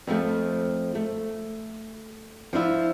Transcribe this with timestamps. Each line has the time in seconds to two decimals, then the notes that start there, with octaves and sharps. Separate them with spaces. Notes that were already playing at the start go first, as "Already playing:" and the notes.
0.07 F2 F3 G3 A3
0.95 A3
2.53 F3 D4 E4 F4